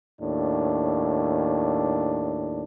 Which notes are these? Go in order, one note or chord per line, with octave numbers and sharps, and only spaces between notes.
D#2 A2 D4